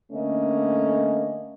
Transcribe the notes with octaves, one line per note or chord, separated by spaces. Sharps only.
D3 A3 A#3 C#4 D#5